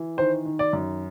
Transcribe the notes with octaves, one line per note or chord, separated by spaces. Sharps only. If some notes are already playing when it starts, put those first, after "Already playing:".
Already playing: E3
D#3 C5
D#3
D5
F#2